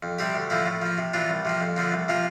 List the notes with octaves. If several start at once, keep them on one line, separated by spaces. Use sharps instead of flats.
F2
C3 G3 C4 G4
D2
D3 F3 A#3 E4
A2
F3 A#3
C3
E3 A#3 D4 F4
C2
C3 F3 A#3
F2
D3 F3 A#3
C2
C3 F3 A#3 F4